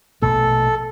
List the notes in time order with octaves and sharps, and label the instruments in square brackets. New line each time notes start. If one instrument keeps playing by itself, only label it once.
[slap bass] A#1 B2 A3 [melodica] A4